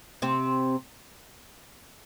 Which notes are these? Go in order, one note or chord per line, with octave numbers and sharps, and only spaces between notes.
C3 C4